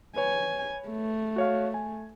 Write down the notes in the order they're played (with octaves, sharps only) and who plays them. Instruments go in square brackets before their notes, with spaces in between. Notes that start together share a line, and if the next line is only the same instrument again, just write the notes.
[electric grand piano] B4 C#5 [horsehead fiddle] G#5
[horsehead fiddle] A3
[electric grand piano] F#4 C#5 F5
G#5